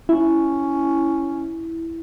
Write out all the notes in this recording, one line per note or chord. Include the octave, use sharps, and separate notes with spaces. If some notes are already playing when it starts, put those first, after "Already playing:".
C#4 E4